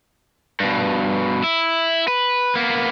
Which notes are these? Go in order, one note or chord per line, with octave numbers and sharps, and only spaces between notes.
G2 B2
E4
B4
A#3 B3